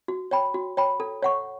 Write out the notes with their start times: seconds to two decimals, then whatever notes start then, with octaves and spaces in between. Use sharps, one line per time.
0.08 F#4
0.31 C#5 G5 B5
0.54 F#4
0.77 C#5 G5 B5
1.00 A4
1.23 C#5 F#5 C#6